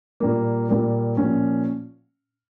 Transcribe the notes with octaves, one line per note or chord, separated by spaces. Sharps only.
A#2 G3 A#3
A#2 G3 A#3
A#2 F3 A#3 C#4